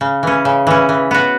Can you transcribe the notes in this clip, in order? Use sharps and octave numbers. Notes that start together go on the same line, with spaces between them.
C#3
E3 C#4
C#3
E3 C#4
E3
B3 F#4